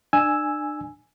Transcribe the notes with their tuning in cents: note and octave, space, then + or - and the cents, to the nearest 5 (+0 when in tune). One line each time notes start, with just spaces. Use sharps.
D4 +35 G#5 +0 E6 +0